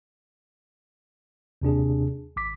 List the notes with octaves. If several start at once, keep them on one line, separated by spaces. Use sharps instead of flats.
D#2 C3 D4 G#4
G#1 D6 B6